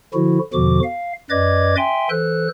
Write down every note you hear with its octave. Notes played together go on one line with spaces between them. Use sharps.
D3 F3 E4 F#4
E2 B2 D3 F3 F#4 D6
F5
F#2 B4 D5 D#5 D6 G#6
E5 G5 G#5 C6
E3 A4 C5 F#6